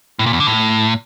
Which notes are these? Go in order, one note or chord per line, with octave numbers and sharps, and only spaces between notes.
A2
A#2
E2
D3
A2